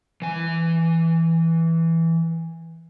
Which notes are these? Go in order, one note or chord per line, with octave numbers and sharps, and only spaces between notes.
E3 G#5